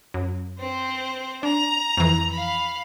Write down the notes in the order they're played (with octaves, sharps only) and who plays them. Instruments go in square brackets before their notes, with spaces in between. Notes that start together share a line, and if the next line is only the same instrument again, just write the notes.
[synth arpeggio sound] F#2
[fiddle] C4 C5
[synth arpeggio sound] D4 [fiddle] A#5
[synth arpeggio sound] F2 E3
[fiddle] F5 B5